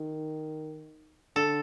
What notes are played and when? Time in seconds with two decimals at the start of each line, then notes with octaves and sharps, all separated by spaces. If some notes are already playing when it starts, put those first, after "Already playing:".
Already playing: D#3
1.36 D3 A4